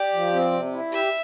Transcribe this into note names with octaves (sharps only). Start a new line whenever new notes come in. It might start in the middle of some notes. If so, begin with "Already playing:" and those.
Already playing: G4 D5
F3
C4
C3
E4
G4 E5